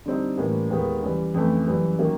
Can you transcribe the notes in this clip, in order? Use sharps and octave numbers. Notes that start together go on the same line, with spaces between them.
D3 G3 C4 D#4
A2 E3 G3 A#3 C#4
D#2 D#3 G#3 B3
C#3 E3 G3
F2 C#3 E3 A3
F#2 C#3 E3 G3
D#3 F#3 A#3 C#4